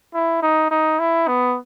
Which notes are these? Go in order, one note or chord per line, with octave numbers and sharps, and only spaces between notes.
E4
D#4
D#4
E4
B3